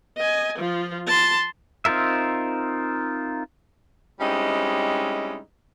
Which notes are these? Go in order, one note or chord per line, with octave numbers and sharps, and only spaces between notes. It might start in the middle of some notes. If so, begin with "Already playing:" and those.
D#5 G#5
F3 F4
A5 C6
C4 D#4 F4 A#4 E5
G3 G#3 C4 C#4 D#4 E4